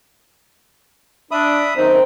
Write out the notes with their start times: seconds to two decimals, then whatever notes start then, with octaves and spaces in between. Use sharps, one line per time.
1.31 D4 E5 B5 D#6
1.77 F#2 D#3 C4 D#4